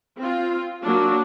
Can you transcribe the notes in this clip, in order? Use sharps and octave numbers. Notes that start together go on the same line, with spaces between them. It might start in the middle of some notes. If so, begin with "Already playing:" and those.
C4 F4
F#3 A#3 D4